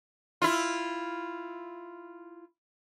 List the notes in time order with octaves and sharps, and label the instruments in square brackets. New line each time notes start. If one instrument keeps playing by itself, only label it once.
[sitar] E4 F4